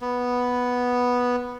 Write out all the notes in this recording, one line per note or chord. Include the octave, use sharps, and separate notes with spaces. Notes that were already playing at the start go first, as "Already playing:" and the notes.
B3